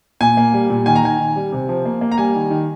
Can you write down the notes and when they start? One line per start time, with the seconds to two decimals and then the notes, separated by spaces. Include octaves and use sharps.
0.21 A#2 G#5
0.37 A#3
0.53 G3
0.70 A#2
0.86 D#3 G#5
0.95 A#5
1.03 D#3 G#5
1.19 D#3
1.36 G3
1.52 C3
1.69 F3
1.85 A#3
2.01 A#3
2.12 A#5
2.18 G3 G#5
2.35 D#3
2.50 D#3